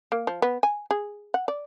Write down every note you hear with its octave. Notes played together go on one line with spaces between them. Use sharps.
A#3
F3
B3
G#5
G#4
F#5
D5